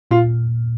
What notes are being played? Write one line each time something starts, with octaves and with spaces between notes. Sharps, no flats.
A#2 F4